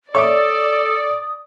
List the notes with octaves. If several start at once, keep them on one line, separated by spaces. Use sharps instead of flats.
A4 C#5 D5 E5 D6 D#6